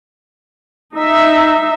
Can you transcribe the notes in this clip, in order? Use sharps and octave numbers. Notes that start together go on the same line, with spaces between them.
D#4 E5